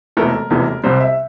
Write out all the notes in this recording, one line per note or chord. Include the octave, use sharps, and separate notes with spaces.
E1 E2 C3 E3 A3 A#4
E1 E2 C3 E3 A3
C2 C3 G3 C5
E5